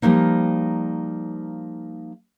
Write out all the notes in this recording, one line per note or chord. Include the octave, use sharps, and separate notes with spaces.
F3 G3 A3 A#3 D#4